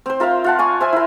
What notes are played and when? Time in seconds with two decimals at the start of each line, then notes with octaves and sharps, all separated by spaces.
0.06 C4 C5
0.20 F4 A#4 E5 F5
0.44 F4 F#5 A5
0.59 D5 G#5 C#6
0.80 C5 E5 G#5
0.93 E4 A#4